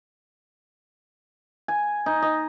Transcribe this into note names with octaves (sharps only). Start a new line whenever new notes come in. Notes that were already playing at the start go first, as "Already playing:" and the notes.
G#5
D#4
D#5